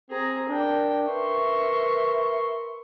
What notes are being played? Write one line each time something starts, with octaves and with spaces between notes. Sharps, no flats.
C4 G#4 A#5
D4 A#4 G5
A#4 B4 E5 C6 C#6